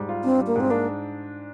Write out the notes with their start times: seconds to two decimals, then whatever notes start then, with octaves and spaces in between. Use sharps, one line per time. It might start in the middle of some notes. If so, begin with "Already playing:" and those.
Already playing: G#2 G3
0.09 F4
0.24 C4 D4
0.40 G3
0.47 A#3
0.55 G#2 C4
0.70 A#3 D4